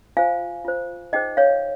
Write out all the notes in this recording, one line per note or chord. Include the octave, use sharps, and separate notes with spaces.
F4 C5 F5 G#5
F4 C5
D#4 G#4 C5 D#5 G5
C#5 F5